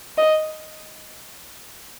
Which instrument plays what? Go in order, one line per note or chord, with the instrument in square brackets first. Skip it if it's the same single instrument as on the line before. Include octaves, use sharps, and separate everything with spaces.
[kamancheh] D#5